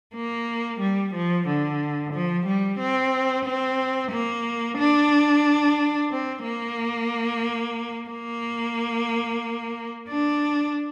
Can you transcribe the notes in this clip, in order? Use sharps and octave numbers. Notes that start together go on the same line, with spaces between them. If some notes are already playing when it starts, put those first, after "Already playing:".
A#3
G3
F3
D3
F3
G3
C4
C4
A#3
D4
C4
A#3
A#3
D4